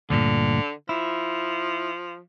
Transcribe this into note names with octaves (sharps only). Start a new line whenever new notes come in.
D2 G2 A#2 D3
F3 E4